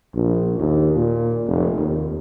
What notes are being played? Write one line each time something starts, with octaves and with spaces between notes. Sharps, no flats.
A#1
D#2
A#2
F1
D#2